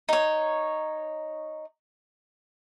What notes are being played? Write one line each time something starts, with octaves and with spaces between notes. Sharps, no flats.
D#4 C#5